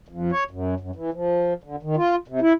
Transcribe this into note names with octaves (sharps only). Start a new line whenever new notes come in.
F2
C#5
F#2
F#2
E3
F3
D3
D#3
F4
C3
E4